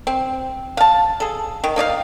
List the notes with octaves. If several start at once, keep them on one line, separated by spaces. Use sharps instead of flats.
C4
F5 A5
G#4 A4
D#3
A#3 D#4 D5 F5